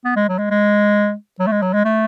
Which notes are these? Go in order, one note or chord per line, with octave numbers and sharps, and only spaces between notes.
B3
G#3
F#3
G#3
G#3
F#3
A3
G#3
F#3
G#3
A3